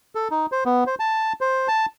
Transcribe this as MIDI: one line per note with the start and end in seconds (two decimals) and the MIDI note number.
0.15 0.28 69
0.31 0.46 63
0.52 0.64 72
0.65 0.84 59
0.87 0.95 72
1.00 1.33 81
1.41 1.68 72
1.68 1.86 81